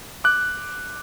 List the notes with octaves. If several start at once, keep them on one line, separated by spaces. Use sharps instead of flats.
D6 F#6